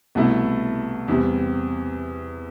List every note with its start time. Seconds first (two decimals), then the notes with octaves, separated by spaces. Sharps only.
0.15 C2 B2 A3 E4
1.08 E2 C3 G3